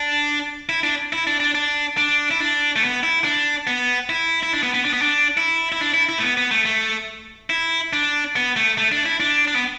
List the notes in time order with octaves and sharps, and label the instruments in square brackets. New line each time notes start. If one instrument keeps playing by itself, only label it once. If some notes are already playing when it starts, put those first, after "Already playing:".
Already playing: [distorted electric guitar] D4
E4
D4
E4
D4
D4
D4
D4
E4
D4
A3
B3
E4
D4
B3
E4
E4
D4
B3
B3
D4
B3
D4
E4
E4
D4
E4
E4
A3
B3
B3
A3
A3
E4
D4
B3
A3
A3
D4
E4
D4
D4
B3